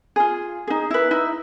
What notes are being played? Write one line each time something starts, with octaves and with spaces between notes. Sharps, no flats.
F4 G#4
D#4 G#4
E4 B4
D#4 E4